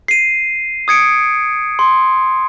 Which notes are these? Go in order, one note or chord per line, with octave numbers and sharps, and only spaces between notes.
C7 D#7
D#6 G#6 C#7 D7
C6